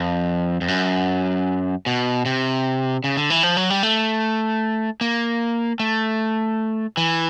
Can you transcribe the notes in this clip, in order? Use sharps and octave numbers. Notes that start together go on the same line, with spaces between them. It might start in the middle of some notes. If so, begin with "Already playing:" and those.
Already playing: F2
F2
F#2
B2
C3
C#3
D3
E3
F3
F#3
G3
A3
A#3
A3
E3